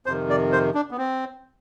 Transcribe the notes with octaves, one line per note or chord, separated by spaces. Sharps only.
F2 C3 D#3 C5
D5
C5
D4
B3
C4